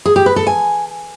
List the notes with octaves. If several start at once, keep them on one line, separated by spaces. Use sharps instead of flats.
G#4
G4
B4
A4
G#5